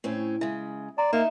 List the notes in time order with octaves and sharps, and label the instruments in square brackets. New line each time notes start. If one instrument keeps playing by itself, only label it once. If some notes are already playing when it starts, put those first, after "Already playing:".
[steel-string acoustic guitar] A2 C4 C#4
[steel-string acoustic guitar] C#3 G#3 [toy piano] E5
[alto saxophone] D5 [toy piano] A#5 C6
[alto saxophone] A#3 [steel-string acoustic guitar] D#4 [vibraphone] E5